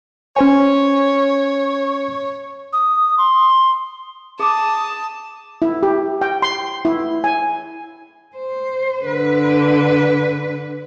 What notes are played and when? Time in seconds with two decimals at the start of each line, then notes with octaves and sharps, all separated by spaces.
0.36 C#4 C5 C#5 G#5
2.73 D#6
3.18 C6
4.39 G#4 A5 D6 D#6
5.62 E4
5.83 G4
6.21 G5
6.42 C6
6.85 E4
7.24 G#5
8.36 C5
9.04 D3 B4